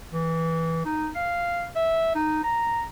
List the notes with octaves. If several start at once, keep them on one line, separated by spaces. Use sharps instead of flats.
E3
D#4
F5
E5
D#4
A#5